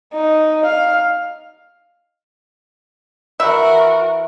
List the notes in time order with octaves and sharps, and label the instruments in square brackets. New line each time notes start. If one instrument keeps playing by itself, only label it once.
[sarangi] D#4
F5
[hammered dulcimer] E3 B5 [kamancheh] F#4 A#4 [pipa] E5